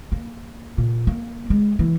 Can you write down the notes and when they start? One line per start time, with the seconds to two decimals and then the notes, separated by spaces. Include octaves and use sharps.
0.12 A#3
0.78 A#2
1.07 A#3
1.50 G#3
1.79 E3